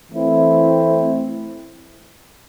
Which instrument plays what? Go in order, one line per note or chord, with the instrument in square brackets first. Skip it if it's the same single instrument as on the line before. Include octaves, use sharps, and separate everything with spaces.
[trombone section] E3 A3 C4 E4